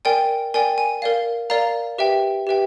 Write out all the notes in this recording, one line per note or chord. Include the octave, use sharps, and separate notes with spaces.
A#4 D5 G5 G#5
A#4 D5 G5 G#5
G#5
A#4 D5 F5
A#4 D5 F5 A#5
G4 B4 E5 G5
G4 B4 E5 G5